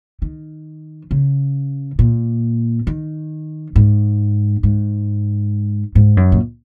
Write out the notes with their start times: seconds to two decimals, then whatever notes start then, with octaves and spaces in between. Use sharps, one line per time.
0.22 D#3
1.11 C#3
1.99 A#2
2.87 D#3
3.76 G#2
4.63 G#2
5.95 G#2
6.17 F#2
6.32 A#2